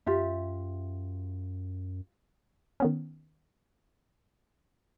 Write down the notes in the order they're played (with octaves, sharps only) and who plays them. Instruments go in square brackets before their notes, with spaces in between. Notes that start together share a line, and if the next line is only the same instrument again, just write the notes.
[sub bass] F#2 [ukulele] F4 G4 E5
[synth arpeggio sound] D#3 B3 C#4